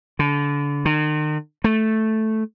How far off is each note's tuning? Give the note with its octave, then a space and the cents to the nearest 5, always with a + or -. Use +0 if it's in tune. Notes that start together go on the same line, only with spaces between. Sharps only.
D3 -30
D#3 -40
A3 -5